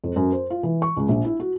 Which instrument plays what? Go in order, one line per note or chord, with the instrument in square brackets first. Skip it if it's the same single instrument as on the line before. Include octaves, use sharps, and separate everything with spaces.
[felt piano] F2
F#2
C5
F4
E3
C#6
C#2
A#1
E4
F#4